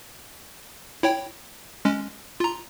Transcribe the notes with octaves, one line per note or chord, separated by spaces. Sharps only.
E4 C#5 G5
G#3 C#4
F4 A#5